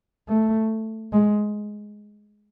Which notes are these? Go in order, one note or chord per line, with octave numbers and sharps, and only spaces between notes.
A3
G#3